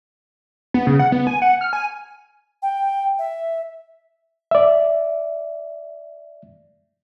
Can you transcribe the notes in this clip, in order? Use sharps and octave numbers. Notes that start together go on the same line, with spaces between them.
B3
C#3
F#5
B3
G#5
F#5
F6
G#5
G5
E5
D5 E5